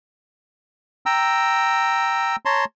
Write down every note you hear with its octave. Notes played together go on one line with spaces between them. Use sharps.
G5 A#5 E6
C#5 A5 A#5 C6